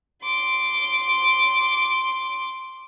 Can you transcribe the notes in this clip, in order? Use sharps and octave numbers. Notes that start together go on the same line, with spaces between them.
C6 D6